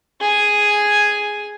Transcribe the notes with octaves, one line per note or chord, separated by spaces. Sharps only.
G#4 G#5